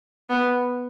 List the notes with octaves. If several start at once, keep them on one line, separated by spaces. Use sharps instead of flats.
B3